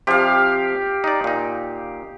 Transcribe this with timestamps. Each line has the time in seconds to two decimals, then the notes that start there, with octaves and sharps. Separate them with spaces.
0.07 C3 F3 G4 F5
1.04 D#4 D5
1.24 A#2 D#4